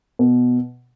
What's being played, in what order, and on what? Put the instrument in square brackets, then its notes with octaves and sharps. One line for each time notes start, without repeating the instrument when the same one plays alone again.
[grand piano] B2